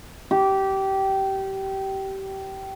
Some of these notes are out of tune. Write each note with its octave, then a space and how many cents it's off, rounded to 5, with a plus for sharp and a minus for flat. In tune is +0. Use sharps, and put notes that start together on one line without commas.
G4 -20